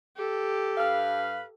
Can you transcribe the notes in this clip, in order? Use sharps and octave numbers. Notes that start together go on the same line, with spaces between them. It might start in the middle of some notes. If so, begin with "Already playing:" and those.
G4 A4
G2 B4 F5